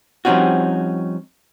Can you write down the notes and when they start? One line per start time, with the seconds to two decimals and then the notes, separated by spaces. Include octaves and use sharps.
0.25 F3 G3 C4 C#4 D#4 F#4